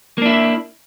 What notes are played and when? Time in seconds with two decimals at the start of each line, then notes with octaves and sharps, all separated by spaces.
0.18 A#3
0.22 D4
0.26 E4
0.29 E5